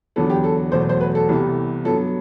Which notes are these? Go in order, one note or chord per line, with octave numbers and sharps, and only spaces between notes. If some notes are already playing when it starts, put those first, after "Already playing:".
E2 D3 F#3 B3 A4
G4
A4
E2 B2 F#3 A3 C5
C5
B4
A4
C2 C3 E3 G3 B3
G2 F#3 B3 A4